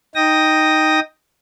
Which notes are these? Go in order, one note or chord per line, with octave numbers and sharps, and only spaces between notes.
D#4 G5 D#6 A#6